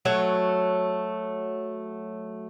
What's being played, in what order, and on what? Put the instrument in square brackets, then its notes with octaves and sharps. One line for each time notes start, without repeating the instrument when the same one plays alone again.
[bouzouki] F#3 A3 C#5